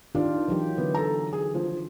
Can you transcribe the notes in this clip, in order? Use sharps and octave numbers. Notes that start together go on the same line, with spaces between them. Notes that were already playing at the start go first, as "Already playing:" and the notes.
D#3 D4 F4 G4 D5
E3 F#3 G4
D3 B3
A4 A#5
G#4
F3